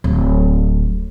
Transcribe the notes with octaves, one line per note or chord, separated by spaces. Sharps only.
D1